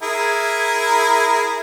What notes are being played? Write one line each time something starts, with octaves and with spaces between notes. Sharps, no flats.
E4 G#4 A#4